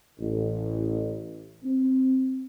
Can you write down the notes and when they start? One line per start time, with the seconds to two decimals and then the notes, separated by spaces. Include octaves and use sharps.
0.19 A1
1.64 C4